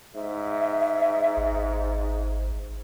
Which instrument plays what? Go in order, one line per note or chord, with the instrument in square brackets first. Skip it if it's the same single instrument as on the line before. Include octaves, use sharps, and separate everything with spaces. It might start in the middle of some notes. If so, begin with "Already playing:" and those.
[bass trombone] G#2 [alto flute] E5
[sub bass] G#1